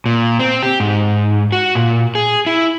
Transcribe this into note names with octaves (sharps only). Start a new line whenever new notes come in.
A#2
C4
G4
G#2
F#4
A#2
G#4
E4